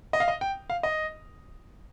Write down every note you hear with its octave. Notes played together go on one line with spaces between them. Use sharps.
D#5
F5
D#5
G5
F5
D#5